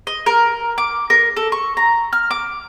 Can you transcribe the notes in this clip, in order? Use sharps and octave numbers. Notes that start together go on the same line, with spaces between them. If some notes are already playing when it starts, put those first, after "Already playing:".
D#5
A#4
D6
A#4
A4
C#6
A#5
F6
D6